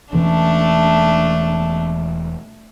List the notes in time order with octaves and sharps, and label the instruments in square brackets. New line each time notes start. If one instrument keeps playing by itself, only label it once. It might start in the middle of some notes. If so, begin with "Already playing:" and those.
[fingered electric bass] E1 E3 C#4 [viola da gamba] A3 D4